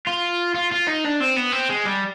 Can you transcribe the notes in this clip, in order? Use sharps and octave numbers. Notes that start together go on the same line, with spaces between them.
F4
F4
F4
D#4
D4
C4
B3
C4
G#3
G3